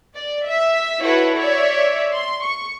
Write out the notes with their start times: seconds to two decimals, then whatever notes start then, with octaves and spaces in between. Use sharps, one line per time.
0.14 D5
0.46 E5
1.01 E4 F#4 A4 B4 C#5
1.36 C#5 D5 E5
2.13 C6
2.43 C#6